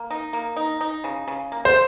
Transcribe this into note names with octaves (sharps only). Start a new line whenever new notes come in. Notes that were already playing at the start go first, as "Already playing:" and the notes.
Already playing: A#3
D#4
A#3
D#4
D#4
C#3
C#3
A#3
C5